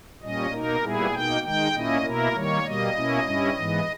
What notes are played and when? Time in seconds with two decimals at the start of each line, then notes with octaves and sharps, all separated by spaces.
0.22 A#2 G3 C#4 D#5
0.52 B2 A#3 D#4 A#4
0.82 A#2 G3 B3 E4 G#4
1.13 B2 A#3 D#4 G5
1.43 D#3 G#3 D#4 G5
1.74 A#2 A#3 C#4 E4 D#5
2.04 B2 A#3 E4 A#4
2.34 D#3 G3 A#3 C#5
2.65 B2 G3 A#3 D#5
2.95 B2 A#3 C#4 E4
3.26 G2 G3 C#4 E4
3.56 G#2 E3 G#3 B3